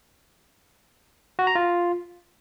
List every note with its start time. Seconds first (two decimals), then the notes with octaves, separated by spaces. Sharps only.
1.39 F#4
1.47 A#5
1.55 F4